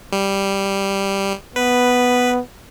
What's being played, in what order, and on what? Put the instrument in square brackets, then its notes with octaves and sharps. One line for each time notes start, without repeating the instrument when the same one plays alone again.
[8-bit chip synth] G3
[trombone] B3 [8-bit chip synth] B4